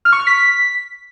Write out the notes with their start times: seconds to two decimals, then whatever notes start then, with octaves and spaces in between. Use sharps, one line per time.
0.05 F6
0.12 C#6
0.20 F6
0.27 B6